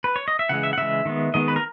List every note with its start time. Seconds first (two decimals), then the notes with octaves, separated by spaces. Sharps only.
0.04 B4
0.16 C#5
0.28 D#5
0.39 E5
0.49 C#3 E3 G#3 F#5
0.63 E5
0.73 F#5
0.78 C#3 E3 G#3 E5
1.05 D#3 G#3 B3
1.34 D#3 G#3 B3 D#5
1.48 B4
1.56 A#4